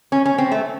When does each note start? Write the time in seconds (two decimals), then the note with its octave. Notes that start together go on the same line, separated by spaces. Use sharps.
0.12 C#4
0.26 C#4
0.38 C4
0.51 A3